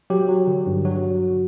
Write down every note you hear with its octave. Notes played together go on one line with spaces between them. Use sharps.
F#3 G4
F#3
D3
G2
F#3 F#4